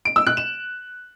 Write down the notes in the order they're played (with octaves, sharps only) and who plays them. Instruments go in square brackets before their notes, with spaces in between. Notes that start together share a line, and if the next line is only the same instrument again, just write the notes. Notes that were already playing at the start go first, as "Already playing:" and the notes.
[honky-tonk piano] D7
E6
F#6
E7